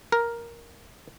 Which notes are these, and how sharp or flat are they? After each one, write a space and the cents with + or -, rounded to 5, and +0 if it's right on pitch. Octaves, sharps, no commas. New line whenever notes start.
A#4 +5